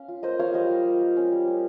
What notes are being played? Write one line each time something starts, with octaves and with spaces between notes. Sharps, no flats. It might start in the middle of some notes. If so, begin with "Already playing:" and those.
Already playing: C#4 F5
F4
A#3 C5 D#5
F4 C#5 F5
G3 C5 D#5
G3
G3
A#3
C#4
G3
C#4